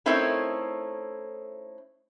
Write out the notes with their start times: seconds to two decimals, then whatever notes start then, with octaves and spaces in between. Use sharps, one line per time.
0.06 A3 C4 C#4 D#4 E4 A#4